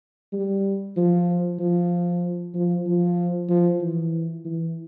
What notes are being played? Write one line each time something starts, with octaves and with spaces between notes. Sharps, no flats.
G3
F3
F3
F3
F3
F3
E3
E3